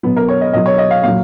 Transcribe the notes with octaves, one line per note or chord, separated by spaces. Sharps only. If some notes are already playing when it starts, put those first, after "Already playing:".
B2 F#3 B3
A#4
C#5
D#5
B2 F#3 D#5
C#5
D#5
F5
A#2 F#3 F5